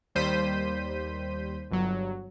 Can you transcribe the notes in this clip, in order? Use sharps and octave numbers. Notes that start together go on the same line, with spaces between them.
D#2 G3 C5 G6 B6 D#7
G1 F#3